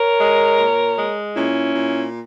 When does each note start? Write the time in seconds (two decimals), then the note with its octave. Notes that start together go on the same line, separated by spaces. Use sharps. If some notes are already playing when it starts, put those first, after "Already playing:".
Already playing: A#4 C#5
0.19 G#3
0.58 A#2
0.97 G#3
1.36 A#2 C#4 E4
1.75 A#2